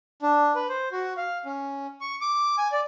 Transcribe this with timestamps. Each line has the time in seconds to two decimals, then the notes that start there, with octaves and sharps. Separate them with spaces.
0.22 D4
0.55 B4
0.69 C5
0.92 F#4
1.17 F5
1.46 C#4
2.01 C#6
2.21 D6
2.58 G#5
2.72 D5